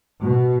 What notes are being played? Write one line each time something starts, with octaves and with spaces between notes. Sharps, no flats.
B2